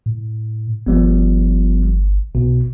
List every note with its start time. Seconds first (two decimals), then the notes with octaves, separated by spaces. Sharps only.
0.06 A2
0.86 G1 F3 G3 B3
2.35 B1 B2